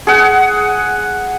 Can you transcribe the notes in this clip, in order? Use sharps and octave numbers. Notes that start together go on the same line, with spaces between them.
G#4 F#5